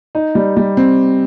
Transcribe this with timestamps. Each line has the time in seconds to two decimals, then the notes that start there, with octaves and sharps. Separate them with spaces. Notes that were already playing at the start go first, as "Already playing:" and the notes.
0.15 D#4
0.35 G3
0.57 G3
0.77 C4